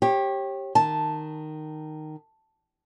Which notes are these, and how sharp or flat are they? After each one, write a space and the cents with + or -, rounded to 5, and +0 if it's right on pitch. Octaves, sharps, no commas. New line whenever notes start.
G4 +0 C#5 -35
D#3 -10 A5 +0